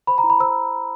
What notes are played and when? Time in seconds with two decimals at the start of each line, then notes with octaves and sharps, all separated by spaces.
0.07 C5 B5
0.18 A#5
0.24 E4
0.30 B5
0.40 C5 E6